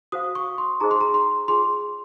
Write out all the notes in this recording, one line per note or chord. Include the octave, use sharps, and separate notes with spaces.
F#4 C5 F5 D#6
C#6
C6
D#4 G#4 C5 D#5 A#5
C6
A#5
C6
F4 G#4 C#5 G#5 C6